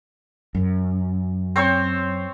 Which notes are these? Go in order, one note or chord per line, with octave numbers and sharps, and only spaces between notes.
F#2
C4 C5 C#5